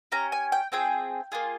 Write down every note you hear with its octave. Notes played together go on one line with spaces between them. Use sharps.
C#4 G4 A#5
G#5
G5
C4 F4 G#4 G5
A#3 F4 G#4